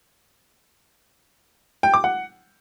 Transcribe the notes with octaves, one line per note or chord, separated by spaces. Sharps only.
G5
D6
F#5